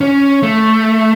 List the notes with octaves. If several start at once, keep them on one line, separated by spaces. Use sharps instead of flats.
C#4
A3